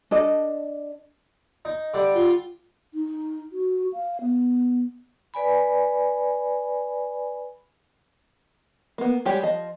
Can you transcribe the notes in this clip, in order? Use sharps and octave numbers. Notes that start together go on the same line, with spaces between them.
D4 A4 D#5
D#4
D3 G3
F4
D#4
F#4
F5
B3
B4 D5 G#5 B5
A#3 B3
G3 G#3 G4 C#5
F3 D#5